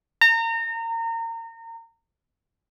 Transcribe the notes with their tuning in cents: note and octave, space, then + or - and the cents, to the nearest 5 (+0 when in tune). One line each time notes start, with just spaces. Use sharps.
A#5 -30